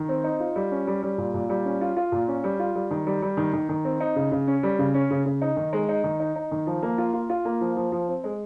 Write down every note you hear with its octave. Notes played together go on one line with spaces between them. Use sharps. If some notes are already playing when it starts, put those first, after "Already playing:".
Already playing: D#3
C4
D#4
F4
G3
C#4
G3
G3
A#2
A#2
G3
C#4
F4
F4
A#2
C#4
G3
F4
G3
D#3
G3
G3
D#3
D#3
D#3
C4
D#4
C#3
C#3
C#4
G3
C#3
C#4
C#3
C#3
D#4
D#3
G#3
D#4
D#3
D#4
D#4
D#3
F3
A#3
F4
F4
F4
A#3
F3
F3
F3
C4
G#3